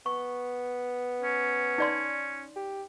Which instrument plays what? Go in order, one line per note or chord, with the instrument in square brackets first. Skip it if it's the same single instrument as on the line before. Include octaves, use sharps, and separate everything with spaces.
[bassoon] B3 [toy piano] C#6
[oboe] C#4
[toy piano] D#4 D5 C6
[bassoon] G4